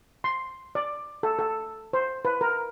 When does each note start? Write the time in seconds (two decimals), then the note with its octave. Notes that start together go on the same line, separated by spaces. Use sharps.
0.24 C6
0.75 D5
1.23 A4
1.39 A4
1.93 C5
2.25 B4
2.41 A#4